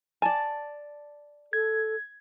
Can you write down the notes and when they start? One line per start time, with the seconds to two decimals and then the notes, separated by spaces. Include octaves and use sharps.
0.22 D5 G#5 A5
1.53 A4 G#6